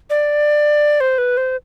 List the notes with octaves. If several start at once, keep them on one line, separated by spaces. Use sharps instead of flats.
D5
C5
B4
C5